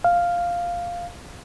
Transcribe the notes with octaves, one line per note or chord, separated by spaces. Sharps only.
F5